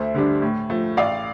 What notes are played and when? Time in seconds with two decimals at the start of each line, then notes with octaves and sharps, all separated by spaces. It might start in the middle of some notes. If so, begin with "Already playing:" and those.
Already playing: D2 C5 E5
0.14 D3 G3 D4
0.42 A2
0.70 F3 A3
0.97 A1 D5 F5